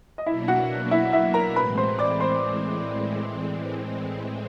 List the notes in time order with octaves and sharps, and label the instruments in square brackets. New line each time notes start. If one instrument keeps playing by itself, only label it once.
[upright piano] D#5
[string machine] B2 F#3 A#3 D4 [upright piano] E4 E5
[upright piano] F#4 F#5
E4 E5
E4 E5
A#4 A#5
[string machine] A2 E3 G#3 C4 [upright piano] B4 B5
[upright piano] C5 C6
D5 D6
C5 C6